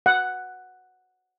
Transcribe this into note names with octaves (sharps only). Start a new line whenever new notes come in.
F#5